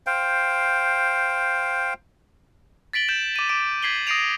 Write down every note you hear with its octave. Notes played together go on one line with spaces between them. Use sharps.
C5 F5 G5
A6 B6 D7 F#7 G7
G6 E7
D6 D#7
D6 D7
G#6 B6 C7 F#7 G7
D#6 A#6 C7 D7 D#7 F7